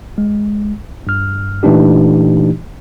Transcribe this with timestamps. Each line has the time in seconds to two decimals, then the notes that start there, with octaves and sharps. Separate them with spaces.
0.18 G#3
1.07 G2 F6
1.63 A#2 E3 A3 D4 D#4 G4